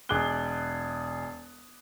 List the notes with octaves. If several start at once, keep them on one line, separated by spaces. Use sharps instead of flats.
E1 G#4 D6 F#6 G7